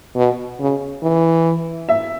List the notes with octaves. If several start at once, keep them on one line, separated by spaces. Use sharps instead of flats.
B2
C#3
E3
E5